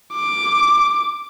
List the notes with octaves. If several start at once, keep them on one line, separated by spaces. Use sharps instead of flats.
D6